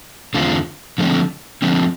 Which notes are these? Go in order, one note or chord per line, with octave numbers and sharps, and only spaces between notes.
E2 D3 A3 C4 F4
D3 F3 A3 C4
D3 F3 A3 C4